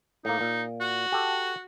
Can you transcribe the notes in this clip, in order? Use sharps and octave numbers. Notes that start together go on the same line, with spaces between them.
A2 A#3 D#4
A#2
F#4
G4 A4